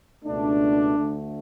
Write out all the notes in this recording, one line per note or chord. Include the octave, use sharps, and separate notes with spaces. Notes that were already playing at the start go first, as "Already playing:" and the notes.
C#2 B2 A3 D4
D2 D3 A3